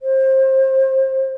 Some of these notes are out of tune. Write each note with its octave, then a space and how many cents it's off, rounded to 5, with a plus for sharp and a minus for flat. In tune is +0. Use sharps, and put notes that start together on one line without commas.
C5 +25